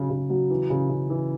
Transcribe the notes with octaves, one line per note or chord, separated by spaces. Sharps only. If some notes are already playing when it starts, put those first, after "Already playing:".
Already playing: C#3 F#3
C#3
F#3
E3
C#3
C#3
E3